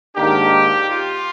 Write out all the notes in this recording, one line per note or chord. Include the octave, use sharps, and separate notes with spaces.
G#2 D#3 A#3 D4 G4
F4